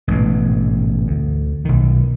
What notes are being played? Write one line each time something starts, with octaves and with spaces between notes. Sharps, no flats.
A1 G#2 B2
D2
B1 D#3